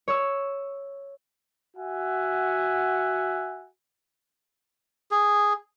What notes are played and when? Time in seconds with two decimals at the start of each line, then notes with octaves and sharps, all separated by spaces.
0.08 C#5 E6
1.77 F#4 E5 F#5 G#5
5.11 G#4